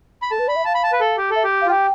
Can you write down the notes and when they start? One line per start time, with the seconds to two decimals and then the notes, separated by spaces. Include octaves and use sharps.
0.22 B5
0.31 A4 A5
0.39 B4
0.48 D5 B5
0.56 E5
0.65 F5 A5
0.74 B5
0.83 A5
0.92 B4
1.00 A4
1.17 G4
1.30 A4
1.36 E5
1.44 G4
1.62 F5
1.66 F4
1.70 G4 G5